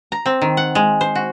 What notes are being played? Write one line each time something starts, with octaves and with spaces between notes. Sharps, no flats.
A#5
C4
D#3
F#5
G#3
C5
F#4